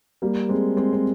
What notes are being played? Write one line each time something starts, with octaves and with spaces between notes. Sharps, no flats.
G3 A#3
G#3 C4
G#3 C4
C4